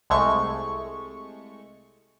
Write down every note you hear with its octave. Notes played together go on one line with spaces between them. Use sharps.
C2 G#3 A3 C#6